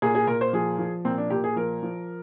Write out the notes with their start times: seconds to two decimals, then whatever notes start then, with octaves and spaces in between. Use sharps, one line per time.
0.02 A#2 G#4
0.15 G#4
0.27 A#2 A#4
0.41 C5
0.53 F3 G#4
0.79 F3
1.05 A#2 C4
1.18 D4
1.30 A#2 G4
1.44 G#4
1.56 F3 A#4
1.83 F3